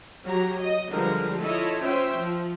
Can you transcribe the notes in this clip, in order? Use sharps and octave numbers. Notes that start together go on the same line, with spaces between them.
F#3 G4 A#5
D#5
D3 F3 G3 G#3 A#4 B4
E4 F4 A4 C#5 D#5
C#4 C5 E5 G5
F3